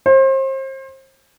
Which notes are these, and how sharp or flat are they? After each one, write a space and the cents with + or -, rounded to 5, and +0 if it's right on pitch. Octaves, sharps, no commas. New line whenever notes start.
C5 +35